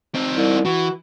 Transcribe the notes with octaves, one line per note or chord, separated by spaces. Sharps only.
C4 D#4
C2
E3 F#4